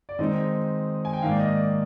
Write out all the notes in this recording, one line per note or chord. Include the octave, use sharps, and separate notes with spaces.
D5
D#3 G#3 C4 D#4 D#5
G#5
G5
G#2 D#3 A#3 F5
D5
D#5
D5